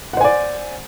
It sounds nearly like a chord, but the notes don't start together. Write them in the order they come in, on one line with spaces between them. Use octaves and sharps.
F#5 C5 G#5 D5